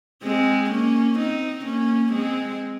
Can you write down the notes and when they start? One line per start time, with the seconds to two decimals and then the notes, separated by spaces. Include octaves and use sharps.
0.23 G#3 C4
0.71 A#3 C#4
1.18 C4 D#4
1.65 A#3 C#4
2.12 G#3 C4